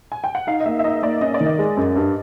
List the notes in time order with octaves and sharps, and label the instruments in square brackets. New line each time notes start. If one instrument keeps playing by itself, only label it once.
[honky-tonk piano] G#5
G5
F#5
[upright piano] D#4 [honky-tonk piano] F5
[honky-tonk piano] D#5
[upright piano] A#3 [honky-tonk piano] E5
[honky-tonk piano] E5
[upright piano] D#4 [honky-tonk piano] D#5
[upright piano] A#3 [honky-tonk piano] D5
[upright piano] C#4 [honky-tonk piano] D#5
[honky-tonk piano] D5
[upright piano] D#3
[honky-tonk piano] D#5
[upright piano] G#3
F#2
G2